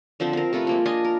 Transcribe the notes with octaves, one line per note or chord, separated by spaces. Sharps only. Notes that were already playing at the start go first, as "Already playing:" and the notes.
D3 F3 C4 C5
C4 A#4
C3 A3 F4 B4
G#3 A#3 F4
D4 F4 D#5 G#5
A#4